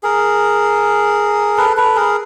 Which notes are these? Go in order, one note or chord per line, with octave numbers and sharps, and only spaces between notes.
G#4 A#4
A4 B4
A4 B4
G#4 A#4